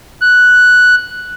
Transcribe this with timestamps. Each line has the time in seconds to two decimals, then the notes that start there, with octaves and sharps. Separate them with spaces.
0.21 F#6